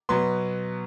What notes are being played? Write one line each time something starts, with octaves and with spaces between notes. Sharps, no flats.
B2 F#3 B3 C6